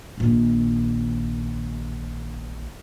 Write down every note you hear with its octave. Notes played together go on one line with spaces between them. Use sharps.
A#1 D#3